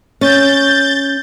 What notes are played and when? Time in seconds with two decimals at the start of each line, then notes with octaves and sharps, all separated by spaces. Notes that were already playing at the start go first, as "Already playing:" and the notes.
0.21 C#4 G6 A6